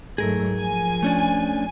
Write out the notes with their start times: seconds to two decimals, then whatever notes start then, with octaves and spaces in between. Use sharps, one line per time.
0.18 G#2 F#3 A3 G#4 A#4
0.56 F3 G#5
1.03 A3 C#4 D4